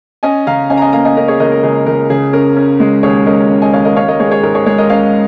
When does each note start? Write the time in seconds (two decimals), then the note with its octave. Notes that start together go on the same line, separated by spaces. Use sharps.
0.23 C#4 D#5 G#5
0.47 C#3 F5 A#5
0.70 C#4 D#5 G#5
0.77 A#5
0.82 D#5 G#5
0.93 A#3 F5 A#5
1.05 D#5 G#5
1.17 C#4 A#4 D#5
1.28 G#4 C#5
1.40 C#2 A#4 D#5
1.52 A#4
1.63 C#2 G#4
1.86 C#2 A#4
2.10 C#3 G#4
2.33 C#4 A#4
2.56 C#4
2.80 G#3
3.03 D#2 G#4 C#5
3.26 C#4 A#4 D#5
3.50 C#3
3.62 D#5 G#5
3.73 D#2 C#5 F5
3.85 A#4 D#5
3.96 C#4 C#5 F5
4.08 A#4 D#5
4.20 G#3 G#4 C#5
4.27 A#4
4.31 G#4 C#5
4.43 G#2 A#4
4.55 G#4 C#5
4.66 G#3 G#4 C#5
4.78 A#4 D#5
4.89 C#4 C#5 F5